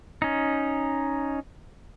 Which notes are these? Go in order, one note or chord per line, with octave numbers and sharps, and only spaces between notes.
C#4 D#4